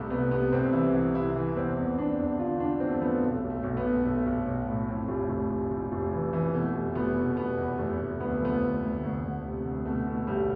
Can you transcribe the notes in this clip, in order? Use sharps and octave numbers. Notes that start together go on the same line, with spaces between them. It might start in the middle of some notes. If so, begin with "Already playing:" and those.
Already playing: C2 A3
C2 B3
C3 B3
C2 C4
E3 E4
C2
C3 E4
E3
E2 C4
E2
E2 D4
E2
D3 F4
E2 D4
E2 C4
A3
F3 B3
B1 A3
B1
A3
B1
B3
B1
B1 A3
B1
B1
A2
F2
F1
F1
F1
F1
F1
E3
E3
B2 A3
F1
F1 B3
B2
F1 B3
E2
F1 A3
F1
D2 B3
A3
F3 B3
D2
D2
D2
D2
C3
D2
B2 A3
B2
A3
B1 G3